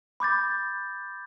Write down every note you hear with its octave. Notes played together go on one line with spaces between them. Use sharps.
B5 D6 G6 A6